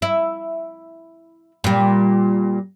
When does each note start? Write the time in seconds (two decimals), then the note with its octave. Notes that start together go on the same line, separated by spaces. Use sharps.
0.02 E4
1.64 A#2 G3